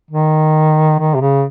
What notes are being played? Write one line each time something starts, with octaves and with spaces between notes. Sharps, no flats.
D#3
D#3
C3
C#3